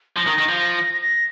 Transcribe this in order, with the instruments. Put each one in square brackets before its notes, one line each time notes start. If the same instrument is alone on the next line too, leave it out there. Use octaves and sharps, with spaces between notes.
[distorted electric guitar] F3 [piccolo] A#6
[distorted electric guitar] D#3
D#3
F3
[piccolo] A#6